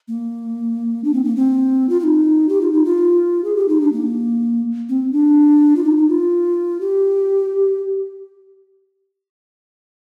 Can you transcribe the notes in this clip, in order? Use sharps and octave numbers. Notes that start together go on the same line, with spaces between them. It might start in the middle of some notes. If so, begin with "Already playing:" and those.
A#3
D4
C4
A#3
C4
F4
F4
D#4
G4
F4
D#4
F4
G#4
G4
D#4
D4
A#3
C4
D4
F4
D#4
D#4
F4
G4